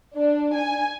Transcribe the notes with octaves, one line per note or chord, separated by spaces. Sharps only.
D4
G#5